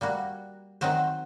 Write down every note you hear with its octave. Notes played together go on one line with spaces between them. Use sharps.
G3 A#3 F#4
D#3 F#3 C4 F#4 C5